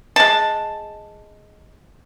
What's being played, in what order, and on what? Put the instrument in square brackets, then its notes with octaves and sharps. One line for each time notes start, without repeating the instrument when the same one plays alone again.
[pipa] G#3 A5